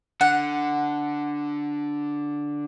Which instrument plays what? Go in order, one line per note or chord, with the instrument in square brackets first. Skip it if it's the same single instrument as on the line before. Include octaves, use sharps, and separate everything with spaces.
[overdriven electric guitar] D3 [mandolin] F#5